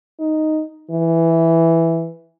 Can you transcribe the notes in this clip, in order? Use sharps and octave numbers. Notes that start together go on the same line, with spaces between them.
D#4
E3